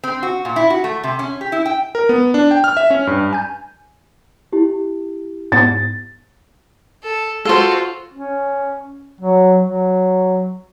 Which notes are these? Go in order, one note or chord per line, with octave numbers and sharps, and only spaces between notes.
C4
F#4
A#2
E4
F#4
A3
C3
C#4
G4
E4
G5
A#4
B3
D4
G5
F6
E5
C#4
G2
G#5 G6
E4 G4
G#2 B3 A6
A4
F4 F#4 A4 C5
C#4
F#3
F#3